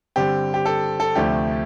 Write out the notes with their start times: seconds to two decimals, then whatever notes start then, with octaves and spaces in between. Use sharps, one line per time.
0.16 G2 D3 G3 C4 G4
0.54 G4
0.65 A4
1.00 A4
1.15 D2 C3 F3 A3 D4 G4